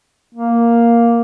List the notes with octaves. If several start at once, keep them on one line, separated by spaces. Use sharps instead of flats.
A#3